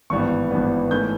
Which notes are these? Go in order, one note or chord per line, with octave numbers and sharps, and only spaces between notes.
G#1 G2 E3 G3 B3 C#6
G#1 G2 E3 G3 B3
G#2 E3 A3 C#4 G6